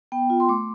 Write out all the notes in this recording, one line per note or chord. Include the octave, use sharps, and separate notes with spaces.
B3 G5
F4
C6
A3 D6